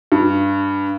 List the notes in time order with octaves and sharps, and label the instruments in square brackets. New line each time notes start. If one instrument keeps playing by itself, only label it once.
[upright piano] G2